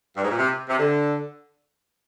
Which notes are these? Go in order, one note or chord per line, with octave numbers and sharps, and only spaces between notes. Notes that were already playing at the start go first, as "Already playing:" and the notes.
G2
G#2
A#2
C3
C3
D3